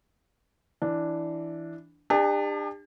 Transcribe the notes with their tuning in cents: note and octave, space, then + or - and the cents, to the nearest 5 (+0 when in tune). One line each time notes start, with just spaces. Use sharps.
E3 +0 D4 +0
D4 +35 G4 +45 A5 -5